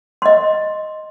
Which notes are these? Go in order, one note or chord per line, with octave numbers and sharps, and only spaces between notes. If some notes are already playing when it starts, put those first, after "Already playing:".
D#5 C6